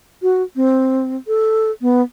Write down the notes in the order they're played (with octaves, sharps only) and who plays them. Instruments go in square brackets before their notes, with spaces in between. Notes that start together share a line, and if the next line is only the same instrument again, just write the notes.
[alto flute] F#4
C4
A4
B3